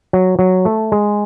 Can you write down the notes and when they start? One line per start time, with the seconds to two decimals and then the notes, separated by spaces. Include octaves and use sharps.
0.13 F#3
0.39 F#3
0.65 A3
0.92 G#3